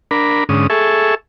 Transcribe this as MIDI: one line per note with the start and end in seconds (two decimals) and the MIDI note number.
0.11 0.44 62
0.11 0.44 70
0.11 0.44 83
0.49 0.67 44
0.49 0.67 50
0.49 0.67 61
0.49 0.67 87
0.70 1.15 68
0.70 1.15 69
0.70 1.15 76
0.70 1.15 85